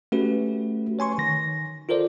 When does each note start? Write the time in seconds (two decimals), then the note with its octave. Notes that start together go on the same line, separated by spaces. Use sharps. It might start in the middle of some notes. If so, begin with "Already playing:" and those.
0.12 A3 C#4 F#4 G4 B4
0.99 C#5 G#5 C6 C#6
1.18 D#3 A#6
1.89 F4 A4 A#4 C5 D5